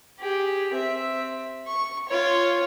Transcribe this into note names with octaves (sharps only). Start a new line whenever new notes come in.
G4 G#4
C4 E5
C#6
F4 C#5